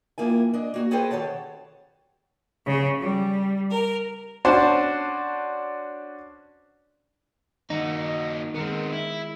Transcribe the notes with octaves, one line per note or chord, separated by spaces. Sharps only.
F2 A#3 E4 G#5
D4 D#5
A#3 F#4
F#4 G#4 A4 B4 C5 G5
D#3 G4 C#5 F#5 A5
C#3
G3
A#4
C#4 D4 F#4 C5 A5
D#3 A#3 D#4 F#4
D#3 G#3 B3 C4 A#4
E4